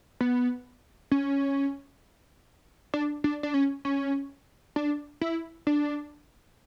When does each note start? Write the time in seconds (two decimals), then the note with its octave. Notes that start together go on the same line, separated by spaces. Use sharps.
0.21 B3
1.11 C#4
2.94 D4
3.24 D4
3.43 D4
3.54 C#4
3.85 C#4
4.76 D4
5.21 E4
5.67 D4